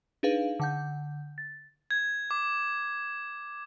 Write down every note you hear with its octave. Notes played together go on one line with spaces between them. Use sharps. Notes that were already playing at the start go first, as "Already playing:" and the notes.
D4 D#4 G#4 B4 F5
D3 F#5 G6
A6
G#6
D6